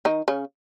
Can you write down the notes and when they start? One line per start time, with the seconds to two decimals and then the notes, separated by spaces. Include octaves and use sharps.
0.05 D#3 D#4
0.28 C#3 C#4